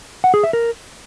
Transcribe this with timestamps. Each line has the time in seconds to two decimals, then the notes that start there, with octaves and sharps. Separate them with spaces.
0.24 F#5
0.34 G#4
0.44 E5
0.53 A#4